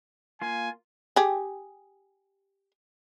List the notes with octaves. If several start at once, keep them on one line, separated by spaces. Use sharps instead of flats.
A#3 F4 G#5
G4 G#4